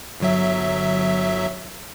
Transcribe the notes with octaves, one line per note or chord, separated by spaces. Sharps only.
G1 F#3 E5